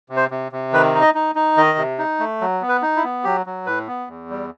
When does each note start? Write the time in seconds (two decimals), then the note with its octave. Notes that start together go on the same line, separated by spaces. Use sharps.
0.09 C3
0.16 C5
0.31 C3
0.52 C3
0.73 D#3 B4
0.94 D#4
1.01 D#5
1.15 D#4
1.35 D#4
1.57 D#3 D#5
1.78 C3
1.98 D#4
2.19 A3
2.41 F#3
2.62 B3
2.69 B4
2.82 D#4
2.96 E4
3.04 B3
3.24 F#3 G4
3.46 F#3
3.66 A2 B4
3.87 B3
4.08 E2
4.30 G3